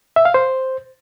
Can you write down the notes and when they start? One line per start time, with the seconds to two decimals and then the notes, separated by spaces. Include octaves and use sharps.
0.16 E5
0.25 F5
0.34 C5